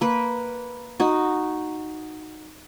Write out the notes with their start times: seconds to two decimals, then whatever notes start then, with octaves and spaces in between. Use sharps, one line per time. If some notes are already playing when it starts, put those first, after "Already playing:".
0.01 A#3 B4
1.00 D#4 F#4